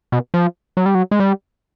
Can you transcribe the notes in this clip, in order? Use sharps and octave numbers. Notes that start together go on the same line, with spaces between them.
B2
F3
F#3
G3
F#3
G#3
G3